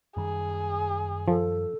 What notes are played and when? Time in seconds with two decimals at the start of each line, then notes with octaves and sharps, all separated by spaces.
0.17 F#2 D#3 G3 G#4
1.28 F3 A4